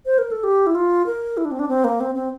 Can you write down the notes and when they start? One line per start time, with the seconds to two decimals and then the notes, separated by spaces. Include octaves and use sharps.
0.06 C5
0.18 A#4
0.31 A4
0.43 G4
0.66 E4
0.75 F4
1.06 A#4
1.37 E4
1.45 D4
1.51 C4
1.59 D4
1.68 C4
1.84 A#3
2.00 C4
2.15 C4